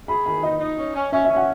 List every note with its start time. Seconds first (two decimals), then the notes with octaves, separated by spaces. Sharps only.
0.08 G#4 B5
0.25 D#3 B5
0.43 D#4 D#5
0.60 D#4
0.78 C#4
0.95 C#4
1.12 C#4 E5
1.25 E5
1.30 C#4
1.36 F#5